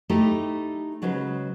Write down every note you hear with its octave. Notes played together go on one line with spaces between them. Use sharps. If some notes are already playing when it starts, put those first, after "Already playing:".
A3 D#4 E4 G4 A4
C#3 F#3 G#3 B4 C5